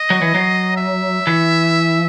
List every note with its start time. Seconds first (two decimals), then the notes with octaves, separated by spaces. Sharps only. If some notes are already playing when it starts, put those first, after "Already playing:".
Already playing: D#5
0.10 F#3
0.22 E3
0.34 F#3
0.77 E5
1.27 E3